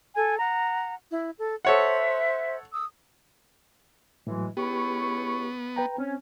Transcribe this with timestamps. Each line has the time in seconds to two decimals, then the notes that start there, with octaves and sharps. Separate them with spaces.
0.15 A4 G#5
0.39 F#5 A#5
1.10 E4
1.36 A4
1.65 A4 C5 C#5 E5 F#5
2.72 D#6 E6
4.27 A2 E3 F#3 G#3
4.57 C#2 B3 E4 G4 C#6
5.76 B4 G5 A#5
5.98 C4 C#4